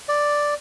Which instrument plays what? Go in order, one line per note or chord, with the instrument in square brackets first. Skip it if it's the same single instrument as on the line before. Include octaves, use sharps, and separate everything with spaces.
[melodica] D5